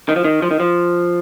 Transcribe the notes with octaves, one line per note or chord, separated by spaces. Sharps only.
D#3
F3
D#3
F3
D#3
F3